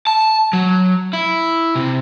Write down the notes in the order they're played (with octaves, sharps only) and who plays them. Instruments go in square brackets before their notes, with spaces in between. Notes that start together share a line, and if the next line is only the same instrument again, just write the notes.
[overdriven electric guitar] A5
F#3
E4
C3